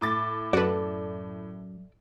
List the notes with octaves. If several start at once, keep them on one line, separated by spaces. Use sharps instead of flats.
A2 D6 A6
F#2 F#4 A4 B4 D5